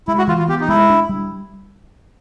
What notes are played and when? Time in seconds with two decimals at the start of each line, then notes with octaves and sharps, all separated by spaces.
0.08 G#3 E4
0.18 F#4
0.28 E3 F4
0.39 F4
0.48 B3 G4
0.61 D#4
0.68 G#3 E4
0.90 D4
1.09 G3